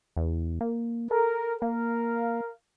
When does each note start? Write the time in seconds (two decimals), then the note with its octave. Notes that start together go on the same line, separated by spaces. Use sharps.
0.17 E2
0.61 A#3
1.11 A4 A#4
1.62 A#3 A#4 F5